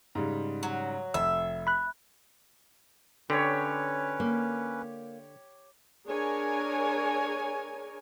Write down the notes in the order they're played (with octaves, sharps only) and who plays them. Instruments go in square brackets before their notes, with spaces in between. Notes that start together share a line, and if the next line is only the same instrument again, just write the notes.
[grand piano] G#2 C#3 G3
[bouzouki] F#3
[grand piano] F1 [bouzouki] E5 [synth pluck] E6
[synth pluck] B5 F#6
[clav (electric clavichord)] D3 [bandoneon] C#4 B4 [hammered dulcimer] G4 C#5
[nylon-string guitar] A#3
[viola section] D4 G#4 A#4 C#5 G#5